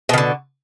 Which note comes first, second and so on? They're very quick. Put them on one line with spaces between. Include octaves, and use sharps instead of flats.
B2 D#3 D3